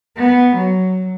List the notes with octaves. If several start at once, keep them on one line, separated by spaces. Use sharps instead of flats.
B3
F#3